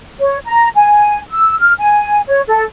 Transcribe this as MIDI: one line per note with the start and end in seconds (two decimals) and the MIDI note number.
0.20 0.38 73
0.45 0.68 82
0.76 1.18 80
1.30 1.58 88
1.59 1.72 89
1.79 2.21 80
2.28 2.42 73
2.48 2.63 69